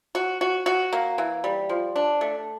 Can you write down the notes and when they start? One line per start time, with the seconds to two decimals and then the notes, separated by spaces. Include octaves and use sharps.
0.15 F#4
0.41 F#4
0.66 F#4
0.93 A#3
1.18 E3
1.44 G3
1.69 F3
1.96 D4
2.21 A3